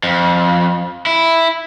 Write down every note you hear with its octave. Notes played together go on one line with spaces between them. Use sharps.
F2
E4